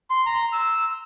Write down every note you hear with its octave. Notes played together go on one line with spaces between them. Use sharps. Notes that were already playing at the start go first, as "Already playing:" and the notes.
C6
A#5
E6